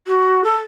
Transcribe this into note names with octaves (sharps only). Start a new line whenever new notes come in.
F#4
A4